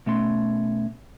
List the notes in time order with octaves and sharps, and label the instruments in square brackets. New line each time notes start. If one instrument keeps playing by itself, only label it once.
[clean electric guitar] B2 A3 C#4 C6